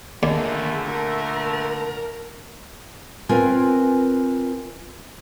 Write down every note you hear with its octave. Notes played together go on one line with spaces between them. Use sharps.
D#2 A#2 D3 A3 A#3 G#4
A#4
C4 F4 A#4 B4 G#5